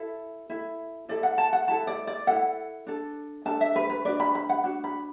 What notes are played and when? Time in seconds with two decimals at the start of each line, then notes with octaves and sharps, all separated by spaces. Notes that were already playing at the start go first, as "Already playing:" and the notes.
Already playing: E4 A4
0.50 E4 A4
1.08 E4 A4 D5
1.23 F#5
1.38 A5
1.53 F#5
1.68 E4 A4 A5
1.87 D5
2.07 D5
2.27 E4 A4 F#5
2.87 D4 A4
3.45 D4 A4 A5
3.61 E5
3.76 B4
3.90 B4
4.05 D4 F#4 B4 D5
4.20 B5
4.35 B5
4.49 F#5
4.64 D4 F#4
4.84 B5